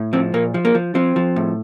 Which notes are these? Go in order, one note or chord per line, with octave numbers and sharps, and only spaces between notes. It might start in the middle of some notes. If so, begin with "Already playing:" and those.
Already playing: A2
F3 C4
A#2 A#3
F3
A#3
F3
F3 C4
F3
A2